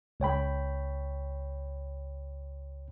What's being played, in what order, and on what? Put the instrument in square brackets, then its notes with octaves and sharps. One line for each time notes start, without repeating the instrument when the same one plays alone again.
[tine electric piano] C#2 C#5 G5 B5